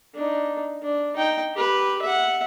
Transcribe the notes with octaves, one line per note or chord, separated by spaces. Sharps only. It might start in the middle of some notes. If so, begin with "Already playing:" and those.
D4 D#4
D4
D#4 G5
G4 B4
E5 F#5